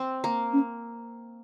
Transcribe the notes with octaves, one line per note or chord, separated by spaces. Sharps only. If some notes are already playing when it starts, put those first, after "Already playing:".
Already playing: C4
A#3
C#4